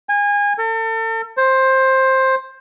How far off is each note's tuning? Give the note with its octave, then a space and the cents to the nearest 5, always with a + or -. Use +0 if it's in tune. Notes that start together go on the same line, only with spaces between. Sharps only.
G#5 -25
A4 +40
C5 +15